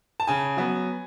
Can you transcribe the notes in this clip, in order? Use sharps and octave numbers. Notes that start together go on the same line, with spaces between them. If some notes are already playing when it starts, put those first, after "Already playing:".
A5
C#3 G#5
F#3 B3